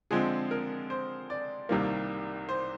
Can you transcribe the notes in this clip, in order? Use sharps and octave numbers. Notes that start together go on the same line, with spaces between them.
D3 F3 G#3 C4 G#4
A#4
C5
D5
C2 C3 D#3 G3 A#3
C5